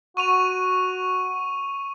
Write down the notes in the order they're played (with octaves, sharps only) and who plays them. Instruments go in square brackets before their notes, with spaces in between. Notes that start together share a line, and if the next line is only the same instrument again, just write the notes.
[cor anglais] F#4 [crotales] C#6 D#7 F7